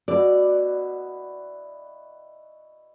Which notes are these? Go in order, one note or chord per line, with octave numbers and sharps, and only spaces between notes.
B2 E4 F#4 D5